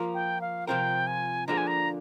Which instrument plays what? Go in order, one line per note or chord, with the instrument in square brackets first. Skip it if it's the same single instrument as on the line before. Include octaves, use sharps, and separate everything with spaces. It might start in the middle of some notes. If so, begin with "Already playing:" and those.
Already playing: [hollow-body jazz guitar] F3 A#3 F4 A#4
[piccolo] G5
F5
[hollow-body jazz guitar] C3 F3 C4 F4 A#4 [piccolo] G5
[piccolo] G#5
[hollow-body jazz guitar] D3 F3 A#3 D4 G#4 [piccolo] A#5
[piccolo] G#5
A#5